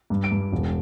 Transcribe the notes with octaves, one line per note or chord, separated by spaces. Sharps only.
G2
D7
G2
E1